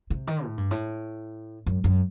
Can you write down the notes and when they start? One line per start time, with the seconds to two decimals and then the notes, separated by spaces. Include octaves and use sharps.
0.10 C3
0.27 D#3
0.45 A2
0.58 G2
0.71 A2
1.66 F#2
1.84 F#2